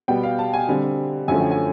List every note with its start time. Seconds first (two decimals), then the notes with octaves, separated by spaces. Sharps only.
0.08 B2 G3 B3 G5
0.23 F5
0.39 A5
0.53 G#5
0.68 D3 G3 C4
1.28 F#2 D3 F3 A3 C#4 G#5
1.40 G5
1.51 G#5